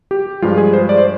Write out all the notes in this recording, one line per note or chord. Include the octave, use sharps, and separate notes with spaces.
G4
G2 F3 G#3 F4
G#4
C5
D5
C5